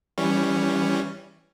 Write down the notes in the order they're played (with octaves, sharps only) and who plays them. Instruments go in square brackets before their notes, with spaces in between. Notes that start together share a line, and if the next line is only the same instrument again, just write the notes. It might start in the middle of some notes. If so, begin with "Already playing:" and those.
[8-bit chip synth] E3 G3 C#4